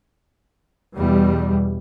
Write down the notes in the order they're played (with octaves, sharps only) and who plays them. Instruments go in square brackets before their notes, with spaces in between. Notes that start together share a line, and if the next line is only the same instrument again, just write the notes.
[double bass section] E2 B2 G3